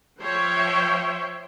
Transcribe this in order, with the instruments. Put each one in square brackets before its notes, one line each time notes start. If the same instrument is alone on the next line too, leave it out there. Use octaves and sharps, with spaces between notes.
[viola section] F3 C5 C#5 E5 G5